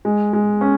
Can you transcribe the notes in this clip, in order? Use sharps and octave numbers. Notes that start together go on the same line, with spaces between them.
G#3
G#3
C#4